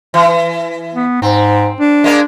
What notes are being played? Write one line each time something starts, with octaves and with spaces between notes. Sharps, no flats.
E3
B3
G#2 C4
D4
G#3 A#3 D5